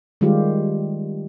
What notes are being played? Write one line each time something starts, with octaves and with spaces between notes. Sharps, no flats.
D#3 G3 G#3 F4 G4